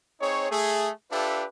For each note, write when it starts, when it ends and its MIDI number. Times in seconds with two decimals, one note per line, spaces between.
0.20 0.48 60
0.20 0.48 63
0.20 0.48 68
0.20 0.48 73
0.50 0.90 57
0.50 0.90 68
1.11 1.44 62
1.11 1.44 65
1.11 1.44 67
1.11 1.44 69
1.11 1.44 71
1.11 1.44 76